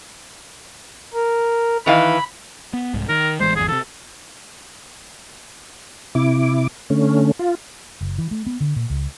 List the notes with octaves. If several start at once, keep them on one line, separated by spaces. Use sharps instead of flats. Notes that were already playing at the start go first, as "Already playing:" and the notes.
A#4
D#3 E3 F5 B5
B3
C2 G#2
D#3 A#4
A1 E3 G#3 C5
G#1 E2 G#4
C3 E3 A4
C3 E4 D6
D3 A3 C#4
F4
F#1
E3
A3
B3
D3
A#2
C#2